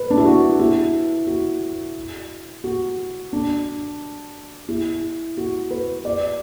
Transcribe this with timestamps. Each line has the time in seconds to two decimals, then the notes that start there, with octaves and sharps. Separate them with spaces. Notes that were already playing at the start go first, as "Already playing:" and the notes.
Already playing: B4
0.10 D4
0.17 E4
0.25 F#4
0.60 E4
1.27 F#4
2.64 F#4
3.33 D4
4.69 E4
5.37 F#4
5.71 B4
6.05 D5